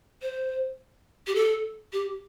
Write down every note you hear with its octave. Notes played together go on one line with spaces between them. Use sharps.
C5
G4
A4
G4